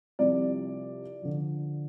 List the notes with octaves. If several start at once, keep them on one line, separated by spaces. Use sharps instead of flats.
C2 C3 F3 D5
D3 F3